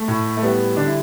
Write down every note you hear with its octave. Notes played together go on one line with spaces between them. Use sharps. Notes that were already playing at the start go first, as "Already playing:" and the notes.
Already playing: A3
A2
A3
G3 B3
D3 D4
E4